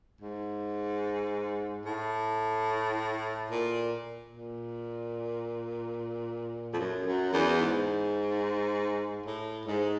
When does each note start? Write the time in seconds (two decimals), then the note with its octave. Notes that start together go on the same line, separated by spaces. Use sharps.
0.22 G#2
1.86 A2
3.50 A#2
4.32 A#2
6.74 F2
6.79 F#2
7.06 F#2
7.34 E2
7.61 G#2
9.25 A2
9.66 G#2